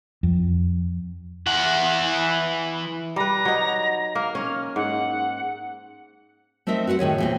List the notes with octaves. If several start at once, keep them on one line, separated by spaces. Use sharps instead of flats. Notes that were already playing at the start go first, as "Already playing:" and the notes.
F2
E3 F#5
G3 B4 A#5
F#3 D#4
A#3 F6
C#4
G#2 F#5
A3 C4 D#4 A#4 E5
F#4 B4 F5 F#5
A2 D#3 G#4 C#5
E2 A#2 C4